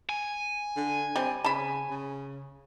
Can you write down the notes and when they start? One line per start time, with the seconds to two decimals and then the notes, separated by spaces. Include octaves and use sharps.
0.09 G#5
0.76 D3
1.16 G3 C4
1.44 C#3 A5 B5
1.90 C#3